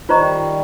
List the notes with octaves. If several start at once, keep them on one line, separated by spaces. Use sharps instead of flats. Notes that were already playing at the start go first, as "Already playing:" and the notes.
D#3 G3 F4 C5 D#5 A#5 C#6